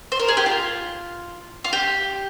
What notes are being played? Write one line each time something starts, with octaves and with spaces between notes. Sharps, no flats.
C5
A#4
G#4
G4
F4
F4
G4